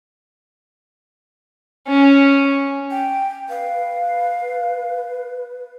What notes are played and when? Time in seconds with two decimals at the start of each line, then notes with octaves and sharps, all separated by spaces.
1.88 C#4
2.91 G5
3.49 B4 F5